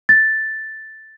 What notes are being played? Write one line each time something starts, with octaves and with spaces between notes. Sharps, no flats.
A6